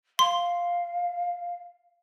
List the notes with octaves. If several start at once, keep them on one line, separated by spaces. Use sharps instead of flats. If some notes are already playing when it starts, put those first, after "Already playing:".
F5 C6